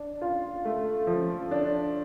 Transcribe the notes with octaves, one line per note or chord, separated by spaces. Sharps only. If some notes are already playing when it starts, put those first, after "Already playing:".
Already playing: D4
F4
A3
F3
D4